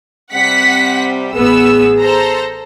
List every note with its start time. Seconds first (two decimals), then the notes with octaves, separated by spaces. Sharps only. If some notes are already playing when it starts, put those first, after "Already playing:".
0.33 C3 G3 C4 F#5 B6
1.34 A1 B3 G#4 E6
1.99 A4 C5 A#5